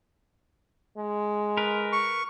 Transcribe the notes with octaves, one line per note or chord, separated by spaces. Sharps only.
G#3
A#4 B4
C#6